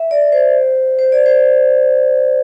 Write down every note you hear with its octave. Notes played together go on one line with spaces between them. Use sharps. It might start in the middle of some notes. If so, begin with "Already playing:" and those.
Already playing: E5
D5
C5
C5
D5
C5